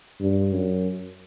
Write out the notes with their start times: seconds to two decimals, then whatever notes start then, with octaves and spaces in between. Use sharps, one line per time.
0.21 G2
0.53 F#2